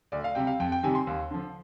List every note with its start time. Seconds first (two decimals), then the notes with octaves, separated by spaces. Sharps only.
0.12 D2 D5
0.24 F5
0.35 C3 G3 G5
0.47 F5
0.60 F2 G5
0.72 G5
0.83 C3 D#3 G3 G#5
0.95 C6
1.07 D#2
1.31 D3 F3